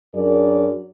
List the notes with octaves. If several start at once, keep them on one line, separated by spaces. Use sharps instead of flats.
F#2 F#3 D4 G#4 A#4 D5